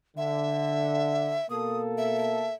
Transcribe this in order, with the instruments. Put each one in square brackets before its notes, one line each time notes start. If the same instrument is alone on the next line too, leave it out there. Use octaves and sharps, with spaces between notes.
[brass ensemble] D3 [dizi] E5
[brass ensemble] B2 A#3 A4 [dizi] D#6
[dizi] E5